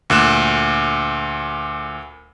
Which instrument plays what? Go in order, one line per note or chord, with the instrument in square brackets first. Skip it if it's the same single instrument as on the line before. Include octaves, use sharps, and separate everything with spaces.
[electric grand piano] D2 A#2 F#6 E7